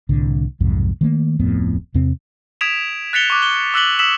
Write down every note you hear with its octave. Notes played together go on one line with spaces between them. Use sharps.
C2 A2 D3
B1 F2 G#2 C3
D#3 A3 A#3
D1 F2 A2 B3
E2 C3 C4
D#6 G#6 B6 D7 E7 F7
F#6 A6 B6 C#7 F7 G7
C#6 D6 F#6
G7
D6 E6 F#6 B6 F#7 G7
D#6 E6 B6 E7 F#7